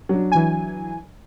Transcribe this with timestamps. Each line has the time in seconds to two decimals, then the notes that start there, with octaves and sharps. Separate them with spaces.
0.09 F#3 D4
0.32 E3 G#5